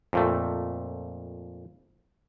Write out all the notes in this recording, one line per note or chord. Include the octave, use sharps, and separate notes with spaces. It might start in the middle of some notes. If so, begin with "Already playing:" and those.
F2 A#2 A3